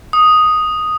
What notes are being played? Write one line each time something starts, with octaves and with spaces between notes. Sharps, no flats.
D#6